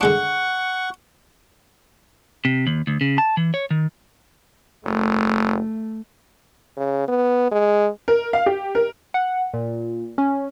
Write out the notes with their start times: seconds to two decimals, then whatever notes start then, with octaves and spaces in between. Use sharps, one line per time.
0.01 D3 G#3 D4 F#5 C#6
2.45 C3
2.67 D#2
2.87 D2
3.01 C#3
3.18 A5
3.37 E3
3.54 C#5
3.71 D#3
4.86 F#1 A3
6.77 C#3
7.08 B3
7.52 G#3
8.08 A#4
8.33 F5
8.46 G4
8.75 A#4
9.14 F#5
9.54 A#2
10.18 C#4